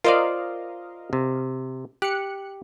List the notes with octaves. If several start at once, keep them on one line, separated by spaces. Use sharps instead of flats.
F4 A#4 C5 D5 D#5 F5
C3
G4 F#6 C#7